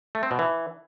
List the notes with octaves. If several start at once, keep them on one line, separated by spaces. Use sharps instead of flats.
A3
C4
B2
E3